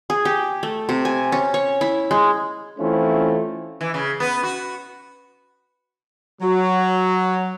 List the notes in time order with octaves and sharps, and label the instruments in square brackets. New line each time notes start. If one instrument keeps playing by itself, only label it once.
[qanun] G#4
G4
A3
C3
G#5
C#4
C#5
E4
G#3
[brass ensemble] E3 A3 C4 C#4 E4 F4
[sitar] E3
C#3
B3
F#4
[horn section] F#3